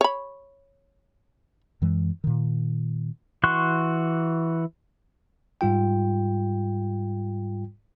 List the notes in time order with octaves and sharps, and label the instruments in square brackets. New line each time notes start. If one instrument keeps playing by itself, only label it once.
[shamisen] C#5 B5
[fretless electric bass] F#2 E3 G#3
A#2 D#3
[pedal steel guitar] E3 F#4 C6 C#6 F#6
[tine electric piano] G#2 G3 F4 G5